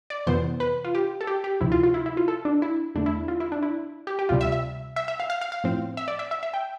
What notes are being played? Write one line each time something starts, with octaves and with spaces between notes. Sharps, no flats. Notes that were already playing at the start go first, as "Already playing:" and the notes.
D5
F2 C3 E3 B3 C5
B4
F4
G4
A4
G4
G4
D2 C3 F3 E4
F4
F4
E4
E4
F4
A4
D4
E4
E2 D3 A3 D4
E4
F4
E4
D4
E4
G4
G4
D2 C3 G3 F4
E5
E5
E5
E5
F5
F5
F5
F5
A2 F3 C4
E5
D5
E5
E5
E5
G5